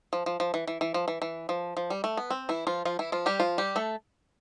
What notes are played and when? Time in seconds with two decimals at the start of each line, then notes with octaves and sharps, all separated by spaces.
0.13 F3
0.26 F3
0.40 F3
0.54 E3
0.67 E3
0.81 E3
0.94 F3
1.08 E3
1.22 E3
1.49 F3
1.77 F3
1.90 G3
2.04 A3
2.17 B3
2.30 C4
2.49 E3 E4
2.67 F3 F4
2.85 F3 F4
2.99 E3 E4
3.12 F3 F4
3.26 G3 G4
3.40 F3 F4
3.58 G3 G4
3.76 A3 A4